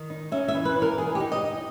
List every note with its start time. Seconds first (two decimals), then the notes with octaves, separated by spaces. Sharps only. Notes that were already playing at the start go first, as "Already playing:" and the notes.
Already playing: D#3
0.10 D#4
0.32 C#4 E5
0.48 E5
0.54 E3
0.65 B4
0.76 E3
0.82 A#4
0.98 B2 G#4
1.15 G4
1.20 D#4
1.32 D#5
1.43 D#4